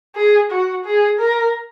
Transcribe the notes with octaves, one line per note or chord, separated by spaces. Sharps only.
G#4
F#4
G#4
A#4